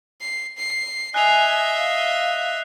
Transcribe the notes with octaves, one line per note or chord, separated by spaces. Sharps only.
C7
C7
D#5 E5 G#5 F#6 C7 F7
F5